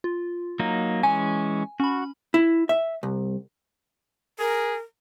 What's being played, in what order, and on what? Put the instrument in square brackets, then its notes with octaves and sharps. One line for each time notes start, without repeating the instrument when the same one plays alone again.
[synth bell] F4
[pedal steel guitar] F#3 A#3 D#4
[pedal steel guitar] E3 G#3 C#4 [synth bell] G#5
[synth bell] C#4 B5 [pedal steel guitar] F#4
[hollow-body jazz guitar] E4
E5
C2
[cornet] G#4 [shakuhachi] A#4